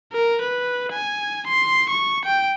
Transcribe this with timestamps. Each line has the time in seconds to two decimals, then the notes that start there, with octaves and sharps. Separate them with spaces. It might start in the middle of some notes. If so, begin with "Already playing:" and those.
0.13 A#4
0.42 B4
0.93 G#5
1.47 C6
1.90 C#6
2.25 G5